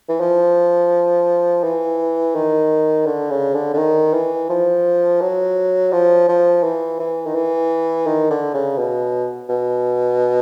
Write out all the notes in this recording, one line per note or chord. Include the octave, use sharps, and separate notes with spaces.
E3
F3
E3
D#3
D3
C#3
D3
D3
D#3
E3
F3
F#3
F3
F3
E3
E3
D#3
E3
D#3
D3
C#3
B2
B2